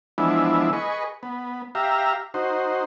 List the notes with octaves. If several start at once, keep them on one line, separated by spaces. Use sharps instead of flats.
E3 F3 G#3 B3 D4 E4
G#4 B4 D#5 C#6
B3
G4 E5 F5 A#5
D#4 F#4 C5